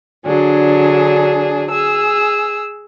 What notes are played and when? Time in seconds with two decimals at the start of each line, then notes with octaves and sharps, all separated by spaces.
0.25 D3 F#3 D4 G#4
1.71 G#4 E6